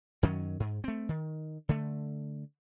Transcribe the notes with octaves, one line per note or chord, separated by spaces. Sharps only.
F#2 D#3 F#3 C#4
G#2
A3 C4
D#3
D3 A3